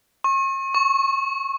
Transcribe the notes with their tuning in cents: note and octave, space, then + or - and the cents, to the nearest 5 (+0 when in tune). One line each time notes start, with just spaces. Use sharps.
C#6 -40
C#6 -5